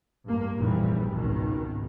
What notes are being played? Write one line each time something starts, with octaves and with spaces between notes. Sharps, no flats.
G2 A#3
F1 A#1 A#2 E3 G3
G#1 C#2 B2 D#3